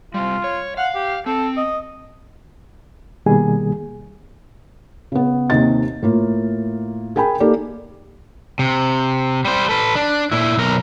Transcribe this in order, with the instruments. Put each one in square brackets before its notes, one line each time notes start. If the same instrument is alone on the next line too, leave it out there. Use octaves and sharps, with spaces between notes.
[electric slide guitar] C3 G3 [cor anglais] F4
[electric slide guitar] C#5
[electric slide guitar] F5 [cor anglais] F#5
[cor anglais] G4
[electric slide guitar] C4 [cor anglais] A4
[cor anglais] D#5
[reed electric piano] B2 D#3 G3 A#3 G#4 G#5
[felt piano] C#3 B3
D#2 C3 D#4 D#5 A6
A2 A#3 F4
G#4 A#4 G5 G#5 B5
A#3 D#4 G4 A4 A#4 D5
[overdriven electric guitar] C3
G3 C5
A4 B4
D4
A#2 E4
B1 A#4